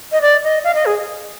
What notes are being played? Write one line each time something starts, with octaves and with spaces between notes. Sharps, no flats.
D#5
D5
D#5
F5
D#5
G#4